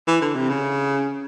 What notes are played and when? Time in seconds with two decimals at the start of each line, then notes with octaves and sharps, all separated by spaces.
0.07 E3
0.21 D3
0.36 C3
0.49 C#3